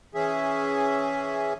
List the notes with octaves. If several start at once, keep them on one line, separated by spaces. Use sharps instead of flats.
E3 C#4 G#4 E5